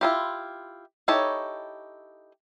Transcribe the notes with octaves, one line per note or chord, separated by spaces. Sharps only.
E4 F4 G4
D#4 E4 G4 A4 C#5